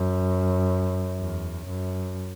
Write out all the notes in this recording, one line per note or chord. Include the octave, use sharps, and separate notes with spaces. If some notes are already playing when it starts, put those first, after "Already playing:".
Already playing: F#2
E2
F#2